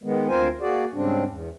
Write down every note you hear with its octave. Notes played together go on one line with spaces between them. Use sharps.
D#3 G#3 B3
D2 C4 F4 A#4 C5 G#5
A#3 F#4 G#4 D5
G#2 C#3 G3 C4 D4
E2